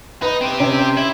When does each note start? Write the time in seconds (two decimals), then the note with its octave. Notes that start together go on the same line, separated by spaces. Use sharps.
0.22 D#4 B4
0.41 C4 G4
0.60 C3 C#4
0.97 E4